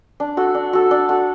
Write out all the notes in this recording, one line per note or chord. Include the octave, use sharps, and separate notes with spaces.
D4
F#4 A4
D4
F#4 A4
D4
F#4 A4